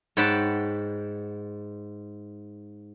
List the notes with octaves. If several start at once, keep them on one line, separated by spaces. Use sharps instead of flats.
G#2 C#5 F#5 G5 A5 B5